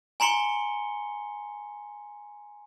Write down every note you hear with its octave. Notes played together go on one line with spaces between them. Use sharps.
G#5 A#5 C6 C#7 G7